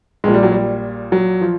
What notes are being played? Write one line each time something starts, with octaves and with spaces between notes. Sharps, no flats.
A#1 A#2 G#3
G3
F#3
G3
F#3
F3